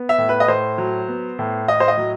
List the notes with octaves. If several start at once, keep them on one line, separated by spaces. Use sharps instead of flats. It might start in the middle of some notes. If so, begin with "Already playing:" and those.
Already playing: B3
E5
A2
B4
D#5
A2 C5
F#3
B3
A2
A2 D#5
C5
D#5
F#3